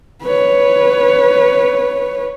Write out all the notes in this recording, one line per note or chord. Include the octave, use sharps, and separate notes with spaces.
B4 C#5